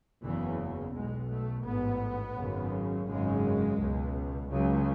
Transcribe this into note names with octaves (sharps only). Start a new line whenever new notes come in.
F#1 E2 C#3 E3
B1 B2 G#3
A3
A1 G#2 B3
G#1 F#2 C#3
G#1 F#2 C#3 G#3
C#2 B2
C#2 C#3 F#3